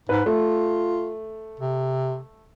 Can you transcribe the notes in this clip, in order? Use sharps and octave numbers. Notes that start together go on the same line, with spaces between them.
G#2 B4
A3 F4
C3